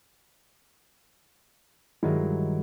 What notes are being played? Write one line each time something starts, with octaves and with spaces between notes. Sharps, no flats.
G2 D#3 F#3 G#3 D#4 E4